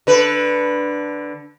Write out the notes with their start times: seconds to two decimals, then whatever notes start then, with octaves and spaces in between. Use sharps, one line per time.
0.07 D3 B4